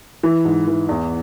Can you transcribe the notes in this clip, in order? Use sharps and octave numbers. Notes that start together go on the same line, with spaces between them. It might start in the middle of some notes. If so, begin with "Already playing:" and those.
E3
G#2
E3
E2